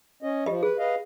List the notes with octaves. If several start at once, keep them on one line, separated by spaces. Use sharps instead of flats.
C#4 D#5
F3 G4 D#5
G#4 B4
B4 D#5 F5